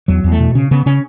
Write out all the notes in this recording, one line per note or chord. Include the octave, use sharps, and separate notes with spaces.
E2 F#3
E2
A3
B2
C#3 C#4
C#3 B3
C#3 C#4